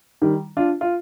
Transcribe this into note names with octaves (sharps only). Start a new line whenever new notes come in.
D#3 G3
D4 F4
F4